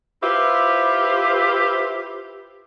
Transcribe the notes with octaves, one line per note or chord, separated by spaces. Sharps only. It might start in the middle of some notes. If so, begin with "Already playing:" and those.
E4 F4 G4 B4 C5 E5